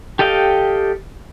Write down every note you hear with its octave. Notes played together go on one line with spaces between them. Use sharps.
G4 A4 D#5 F5 G5